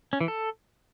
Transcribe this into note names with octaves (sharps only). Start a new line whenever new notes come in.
C#4
E3
A4